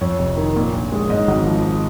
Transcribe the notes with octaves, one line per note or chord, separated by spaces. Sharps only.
F2 C#5
F1
D#3
A#2
A#1
G#3
G#2 D#5
G#1
F3